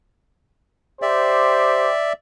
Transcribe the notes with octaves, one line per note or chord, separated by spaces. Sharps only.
G4 C5 D5 E5